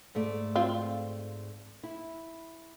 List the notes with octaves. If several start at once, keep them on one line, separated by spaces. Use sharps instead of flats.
G#2 A3 D5
C4 F4
E4